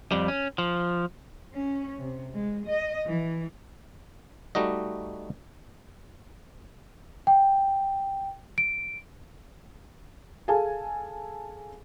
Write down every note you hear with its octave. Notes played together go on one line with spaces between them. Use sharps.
F2 G3
C#4
F3
C#4
C3
G#3
D#5
E3
G3 A3 D#4 F#4 D#5
G5
D7
G#4 A4 F5 G#5 A5